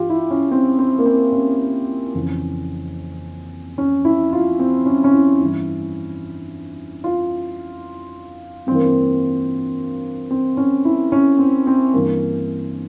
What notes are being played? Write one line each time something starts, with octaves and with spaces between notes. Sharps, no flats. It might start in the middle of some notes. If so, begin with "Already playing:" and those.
Already playing: G2 E3 F4 G4
E4
C#4
C4
C4
A#3
C4
C#4
F2 C#3 E3
C#4
E4
F4
C4
C#4
C#4
E4
G2 E3 E4
F4
G2 E3 A#3 C4
C4
C4
C#4
E4
C#4
C4
C4
G2 E3 A#3